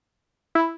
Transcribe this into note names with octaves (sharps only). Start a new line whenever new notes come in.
E4